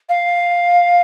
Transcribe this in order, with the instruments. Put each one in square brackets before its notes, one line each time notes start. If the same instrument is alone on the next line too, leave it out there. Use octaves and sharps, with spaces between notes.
[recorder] F5